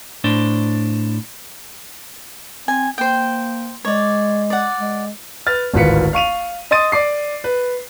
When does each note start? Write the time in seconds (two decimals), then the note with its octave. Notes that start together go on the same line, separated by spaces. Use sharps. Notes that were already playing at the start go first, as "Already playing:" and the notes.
0.24 A2 D4 C5
2.68 C4 G#5
2.98 A#3 C5 G5
3.85 G#3 C#5 D5
4.50 D5 F#5
4.80 G#3
5.46 B4 F6 A6
5.74 D1 G#1 F4 B4 B6 C#7
6.13 F5 C#6 D#7 F7
6.71 D#5 C6 D#6 A6 D#7
6.92 D5 D6 C7
7.44 B4